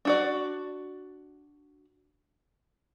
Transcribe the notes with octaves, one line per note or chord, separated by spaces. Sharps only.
D4 F#4 D5